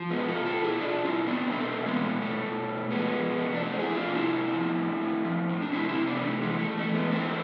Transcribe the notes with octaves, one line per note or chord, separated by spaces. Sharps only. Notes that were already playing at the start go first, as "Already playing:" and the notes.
Already playing: F3
B2 G#3 B3
F4 A4
B2
F4 A4
B2
E4 G#4
B2 D4 F4
B2 C4 E4
B2 B3 D4
B2 A3 C4
B2
G#3 B3
B2
B2 A3
B2
B2
F3 G#3 B3
F3
C3
D4
F3 A3 C4
E4 G#4
F3
D4 F4
C3
C4 E4
A2
F3
A2
A2
F3
A2
D4
C3 C4 E4
C4 E4
C3
B3 D4
E3
A3
E3 G#3
A3
E3
A3
E3
G#3 B3
E3 A3 C4